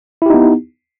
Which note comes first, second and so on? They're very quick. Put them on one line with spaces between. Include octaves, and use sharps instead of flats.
E4 G4 D#4 B3